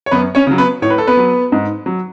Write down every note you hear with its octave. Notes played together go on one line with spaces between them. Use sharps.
C#5
F#2 B3 B4
C#4 C#5
C#3 F#3
B3 B4
A2 C#5
B4
A4
B3 B4
F#3
G#2
F#3